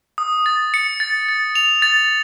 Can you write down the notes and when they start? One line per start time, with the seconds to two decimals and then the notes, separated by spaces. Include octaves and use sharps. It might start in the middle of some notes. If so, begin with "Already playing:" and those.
0.18 D#6
0.46 A6
0.74 C#7
1.00 A6
1.29 A6
1.55 F7
1.82 A6